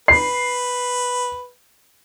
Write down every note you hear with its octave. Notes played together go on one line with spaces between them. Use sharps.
B4 C7